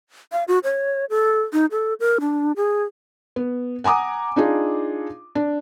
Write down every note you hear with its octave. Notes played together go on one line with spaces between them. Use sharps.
F5
F#4
C#5
A4
D#4
A4
A#4
D4
G#4
B3
F#5 G#5 A#5 D6 D#6
D4 D#4 F4 G#4
D4